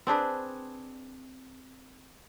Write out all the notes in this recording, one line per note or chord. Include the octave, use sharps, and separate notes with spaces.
C4 D4 G#4 B4